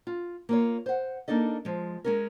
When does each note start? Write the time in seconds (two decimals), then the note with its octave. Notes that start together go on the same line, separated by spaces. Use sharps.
0.07 F4
0.49 A#3 F4 C#5
0.86 C5 F#5
1.28 A#3 D4 D#4 A4 D#5
1.65 F3 G#3
2.04 G#3 C#4 A#4